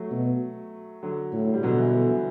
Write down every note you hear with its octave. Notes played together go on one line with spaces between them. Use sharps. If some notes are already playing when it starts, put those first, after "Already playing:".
Already playing: F#3 A3
B2
D3 F#3
A2
G3
B2 D3 F#3
E3
D3
E3